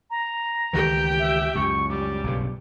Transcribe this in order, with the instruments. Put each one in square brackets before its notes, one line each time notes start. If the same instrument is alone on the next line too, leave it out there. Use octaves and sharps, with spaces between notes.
[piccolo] A#5
[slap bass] C#2 D#3 E3 [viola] G4 G5
[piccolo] E5
[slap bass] C#2 F#2 [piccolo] C#6
[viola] G3 [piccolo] D6
[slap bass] B1 G2 C#3